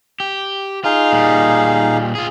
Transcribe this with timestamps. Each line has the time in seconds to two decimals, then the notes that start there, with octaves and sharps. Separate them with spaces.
0.20 G4
0.84 D#4 F4 G#4 F5
1.12 A#2 G3
2.15 F4 G#4